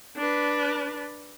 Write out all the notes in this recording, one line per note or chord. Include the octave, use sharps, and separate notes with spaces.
D4 B4